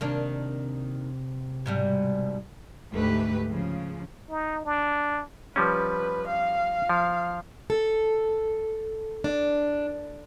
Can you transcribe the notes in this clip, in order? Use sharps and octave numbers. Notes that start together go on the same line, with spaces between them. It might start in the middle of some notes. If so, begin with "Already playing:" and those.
C3 D#3 A#3 D4
G#2 B2 G3
D2 G#2 A3 G4 B4
C#3 F3
D#4
D4
F3 G3 C#4 B4
F5
F3
A4
D4